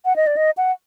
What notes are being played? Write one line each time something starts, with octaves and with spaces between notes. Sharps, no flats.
F#5
D#5
D5
D#5
F#5